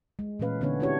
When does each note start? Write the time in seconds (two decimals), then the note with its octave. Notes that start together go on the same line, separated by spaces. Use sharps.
0.19 G#3
0.40 A#2 E3 A3 C#4 B4 F5
0.61 D3 B3 C#4 D4 B4 C#5
0.80 C4 D4 E4 F#4 G4 C#5